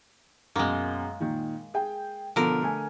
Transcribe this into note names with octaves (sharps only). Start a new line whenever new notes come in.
F#2 B2 G#3 A#3
A#2 D#3
G#4 G5
B2 D3 F3 B3 A#4
A3 G#5